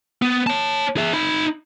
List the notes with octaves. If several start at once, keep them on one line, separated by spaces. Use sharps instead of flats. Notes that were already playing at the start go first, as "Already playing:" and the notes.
B3
C#5 A5
G#4 E5
D#4 B5